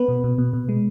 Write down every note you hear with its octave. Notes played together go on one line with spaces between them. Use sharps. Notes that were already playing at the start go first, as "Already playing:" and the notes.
Already playing: B3 B4
B2
B2
B2
B2
G#3